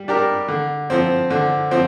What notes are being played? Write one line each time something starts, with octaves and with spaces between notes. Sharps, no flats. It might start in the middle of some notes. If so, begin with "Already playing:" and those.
Already playing: G3
D4 G4 A#4
D3
F3 C4
D3
F3 C4